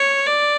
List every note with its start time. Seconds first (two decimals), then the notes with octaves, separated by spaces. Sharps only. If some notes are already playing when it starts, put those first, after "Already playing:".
Already playing: C#5
0.27 D5